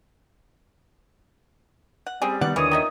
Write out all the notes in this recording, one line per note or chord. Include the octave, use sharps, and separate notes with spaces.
F#5
G3 C4 C#4 G#4
D#3 B3 D5 F#5
D#2 A#2 D3 E3 C#5 D#6
D#3 D#5 E5